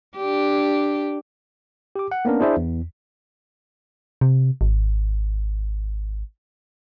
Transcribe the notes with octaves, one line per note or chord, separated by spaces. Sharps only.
D4 G4
G4 D6
F#5
A#3 B3 C#4 D4 A#4
D4 E4 G#4 C5 D5 E5
E2
C3
G#1